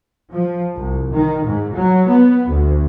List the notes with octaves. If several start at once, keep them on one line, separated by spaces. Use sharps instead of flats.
F3
C2
D#3
G#2
F#3
B3
D2